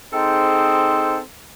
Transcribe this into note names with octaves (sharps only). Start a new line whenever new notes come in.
C4 D#4 G#4 A4 C5